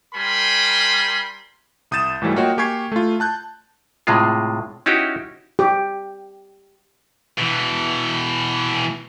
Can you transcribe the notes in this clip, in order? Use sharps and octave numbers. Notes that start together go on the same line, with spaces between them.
G3 A#4 G#5 B5 C6
C2 D#6 G6 A6 E7
G#2 E3 F#3 G3 A3
A#3 F4 F#4 C#5 D#5 G5
A#3 G4 G#5 C#6 G#6 C7
A3 F4
A5 F#6 G6
A2 C3 G#3 F4
C#4 D#4 E4 F#4 G4
G4
B2 E3